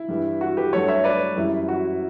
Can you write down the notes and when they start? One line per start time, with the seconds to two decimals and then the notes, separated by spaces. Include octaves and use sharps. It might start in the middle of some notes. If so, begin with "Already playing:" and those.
Already playing: E4
0.08 G2 E3 G3
0.41 F#4
0.57 G4 B4
0.73 G2 F#3 A3 A4 C#5
0.88 C#5 E5
1.04 B4 D5
1.36 F#2 E3 G3 E4
1.68 F#4